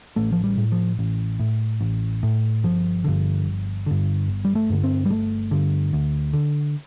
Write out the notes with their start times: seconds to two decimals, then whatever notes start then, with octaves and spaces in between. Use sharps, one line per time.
0.16 A1 A3
0.32 F3
0.44 G3
0.57 A2
0.72 F3
0.99 A1
1.39 A2
1.81 A1
2.23 A2
2.64 G1 F3
3.04 G2 D3
3.45 G1
3.86 G2 D3
4.28 G1
4.45 G3
4.55 A3
4.70 G2 D3
4.84 C4
5.06 G3
5.10 G1 A3
5.51 G2 D3
5.93 D2
6.33 D3